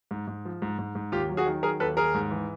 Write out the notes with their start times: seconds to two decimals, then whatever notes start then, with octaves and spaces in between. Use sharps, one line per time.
0.11 G#2
0.27 G#2
0.45 F3
0.62 G#2
0.79 G#2
0.95 G#2
1.12 D#2 F4 G4
1.29 F#3
1.37 F#4 G#4
1.46 D#3
1.63 F#3 G#4 A#4
1.80 D#2 A4 B4
1.97 D#2 G#4 A#4
2.14 G#2
2.31 E3